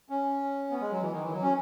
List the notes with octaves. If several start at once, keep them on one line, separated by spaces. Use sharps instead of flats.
C#4
B3
G#3
F#3
E3
D#3
E3
F#3
C#4